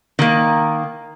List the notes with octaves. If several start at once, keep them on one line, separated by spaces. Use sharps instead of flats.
D#3 A#3